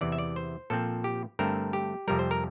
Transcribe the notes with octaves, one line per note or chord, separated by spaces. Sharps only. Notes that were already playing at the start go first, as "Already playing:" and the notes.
E2 C3 E3 D5
E5
D5
C5
A#2 F3 C4 A4
G4
G2 D3 A3 C4 A#4
G4
F2 C3 G3 A#4
C5
A#4